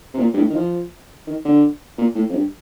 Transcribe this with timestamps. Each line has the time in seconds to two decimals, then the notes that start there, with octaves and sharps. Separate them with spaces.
0.14 C3
0.19 A#2
0.34 G2
0.37 A2
0.50 D#3
0.55 F3
1.27 D#3
1.45 D3
1.98 A#2
2.15 A2
2.30 F2
2.34 G2